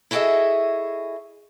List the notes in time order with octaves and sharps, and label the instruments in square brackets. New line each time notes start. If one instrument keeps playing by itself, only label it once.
[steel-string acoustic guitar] E4 F#4 G#4 A4 D#5 E5